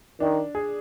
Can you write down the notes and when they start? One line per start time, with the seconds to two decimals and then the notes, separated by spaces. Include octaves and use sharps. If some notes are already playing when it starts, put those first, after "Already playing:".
0.20 D#3 D4
0.55 G#4